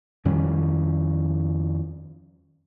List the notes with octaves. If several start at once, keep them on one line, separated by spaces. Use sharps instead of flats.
F2 D#3 G3 C#4